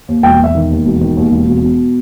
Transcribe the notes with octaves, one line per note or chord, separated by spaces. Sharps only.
D#2
E1 G5
E1 E5
D#3
D#2
E1
D#3
D#2
E1
B2
B2